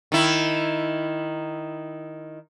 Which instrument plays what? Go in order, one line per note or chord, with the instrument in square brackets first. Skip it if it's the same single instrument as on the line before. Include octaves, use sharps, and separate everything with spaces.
[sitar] D#3 E4